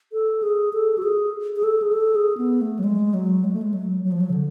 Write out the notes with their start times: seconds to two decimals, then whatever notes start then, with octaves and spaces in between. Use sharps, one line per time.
0.13 A4
0.43 G#4
0.73 A4
0.98 F#4
1.03 G#4
1.56 G#4
1.63 A4
1.82 G#4
1.93 A4
2.16 G#4
2.38 B3
2.61 A3
2.79 F#3
2.84 G#3
3.14 F#3
3.44 G#3
3.53 A3
3.62 G#3
3.74 F#3
4.03 F#3
4.12 F3
4.20 F#3
4.30 C#3
4.34 D3